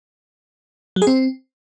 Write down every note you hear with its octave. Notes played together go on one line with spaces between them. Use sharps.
F#3
G#4
C4